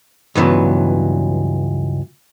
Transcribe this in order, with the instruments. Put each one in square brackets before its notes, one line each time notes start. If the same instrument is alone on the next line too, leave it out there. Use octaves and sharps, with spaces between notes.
[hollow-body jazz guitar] C#2 G2 E3 F#3 B3